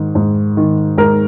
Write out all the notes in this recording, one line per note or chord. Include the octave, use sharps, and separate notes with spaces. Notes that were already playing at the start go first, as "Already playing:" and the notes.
Already playing: G#2 D#3
G#2
D#3
G#2 A#4